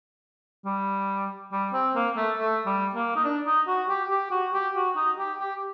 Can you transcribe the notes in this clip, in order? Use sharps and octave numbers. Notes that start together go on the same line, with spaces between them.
G3
G3
C4
A#3
A3
A3
G3
A#3
D#4
D4
D#4
F#4
G4
G4
F#4
G4
F#4
D#4
G4
G4